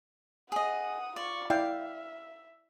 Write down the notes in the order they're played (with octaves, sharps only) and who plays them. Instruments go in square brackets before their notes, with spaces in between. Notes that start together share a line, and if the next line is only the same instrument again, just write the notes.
[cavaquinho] G#4 D#5 [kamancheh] F#5 D#6
[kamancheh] F4 C#6 [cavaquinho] D5
[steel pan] E4 D5 G5 [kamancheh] E5 [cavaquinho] F5